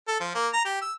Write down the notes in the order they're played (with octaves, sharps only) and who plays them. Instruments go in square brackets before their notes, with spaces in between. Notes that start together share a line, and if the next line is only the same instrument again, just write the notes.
[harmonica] A4
F3
A#3
A#5
G4
E6